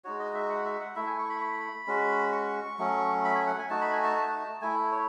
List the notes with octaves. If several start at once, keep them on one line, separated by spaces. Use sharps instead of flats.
G#3 D#4 F#4 C#5
D#5
E5
F#5
E5
F#5
A3 E4 E5
G#5
C#6
B5
C#6
B5
G#3 C#4 F#4
C#6
F#3 A3 C#4
B5
G#5
F#5
G#5
A3 D#4 F#4 A5
B5
G#5
A5
A5
A3 E4 G#5
C#5